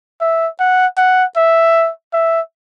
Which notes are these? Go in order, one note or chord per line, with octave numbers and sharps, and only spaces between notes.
E5
F#5
F#5
E5
E5